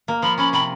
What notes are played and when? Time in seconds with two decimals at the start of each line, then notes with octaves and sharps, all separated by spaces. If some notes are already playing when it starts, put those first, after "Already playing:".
0.08 A#3
0.22 F3 B5
0.38 C#4 B5
0.53 C3 B5